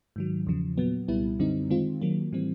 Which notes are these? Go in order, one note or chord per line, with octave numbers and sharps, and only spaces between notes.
G#2 D#3 F#3
E2 C#3 F3
A#2 F#3 B3
C2 A#2 G3 B3 E4
F#2 D3 G3 C4 D#4
D#3 G#3 C4 F4
D#3 F#3 A#3
A2 E3 G3 C4